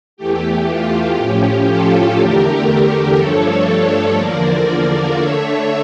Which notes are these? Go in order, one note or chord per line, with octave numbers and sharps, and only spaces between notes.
E2 E3 A3 G4
F4
A2 F3 C#4 G4
F4 A4
E2 D3 A3 G4 A#4
G2 F3 A3 D4 A4 C#5
A4 C#5
E2 D3 F3 A#3 A#4 D5
D3 A3 D4 C#5 E5